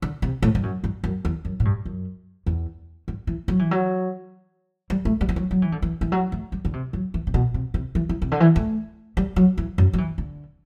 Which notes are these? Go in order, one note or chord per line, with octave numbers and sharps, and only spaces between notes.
D3
C3
A2
G2
F#2
G2
F#2
E2
F#2
A2
G2
F#2
E2
G2
E3
F#3
E3
F#3
G3
A3
G3
E3
F#3
F#3
E3
D3
E3
E3
F#3
A3
G3
D3
C3
F#3
E3
C3
B2
C3
C3
E3
E3
C3
D3
E3
A3
G3
F#3
E3
F#2
F#3
E3
D3